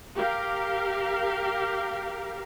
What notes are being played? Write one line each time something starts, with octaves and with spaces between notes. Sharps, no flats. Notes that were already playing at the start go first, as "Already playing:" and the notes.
G4 A#4 F5